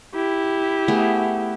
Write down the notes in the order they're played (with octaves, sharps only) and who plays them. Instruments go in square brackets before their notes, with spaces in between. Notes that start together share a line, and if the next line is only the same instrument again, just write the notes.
[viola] E4 G4
[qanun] A3 B3 G#4